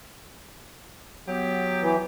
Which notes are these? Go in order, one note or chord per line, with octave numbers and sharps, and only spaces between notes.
F#3 B3 G4
E3